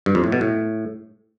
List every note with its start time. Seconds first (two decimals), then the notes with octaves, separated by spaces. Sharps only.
0.06 G2
0.15 F2
0.24 A2
0.32 B2
0.41 A2